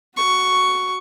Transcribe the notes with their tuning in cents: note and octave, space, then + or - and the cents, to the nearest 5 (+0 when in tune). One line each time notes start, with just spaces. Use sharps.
F#4 +0 C#6 +5